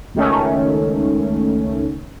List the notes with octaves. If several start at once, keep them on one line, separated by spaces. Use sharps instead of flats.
C#2 D#3 A3 C#4